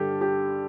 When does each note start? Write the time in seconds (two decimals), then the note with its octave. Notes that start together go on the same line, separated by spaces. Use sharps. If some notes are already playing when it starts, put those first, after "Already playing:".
Already playing: G2 D3 G3 G4 A4
0.21 G4